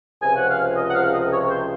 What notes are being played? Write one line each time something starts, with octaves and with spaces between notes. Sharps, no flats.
C#2 C3 F3 G#5
F#5
F5
D#5
F#5
F5
D#5
C#5
C5